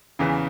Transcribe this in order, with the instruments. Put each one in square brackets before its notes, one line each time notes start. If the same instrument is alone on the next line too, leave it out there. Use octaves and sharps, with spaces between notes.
[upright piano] E2 C#3 E3